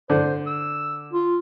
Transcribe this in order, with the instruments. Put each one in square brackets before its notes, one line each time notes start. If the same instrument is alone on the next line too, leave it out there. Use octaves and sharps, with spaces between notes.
[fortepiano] D3 [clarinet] C5
[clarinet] E6
F4